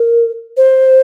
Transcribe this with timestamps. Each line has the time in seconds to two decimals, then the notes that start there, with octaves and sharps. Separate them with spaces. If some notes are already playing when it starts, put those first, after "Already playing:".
Already playing: A#4
0.57 C5